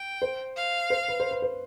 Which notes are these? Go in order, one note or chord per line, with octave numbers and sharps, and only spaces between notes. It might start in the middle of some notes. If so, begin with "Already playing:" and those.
Already playing: G5
C5
F5
C5
B4
C5
B4
C5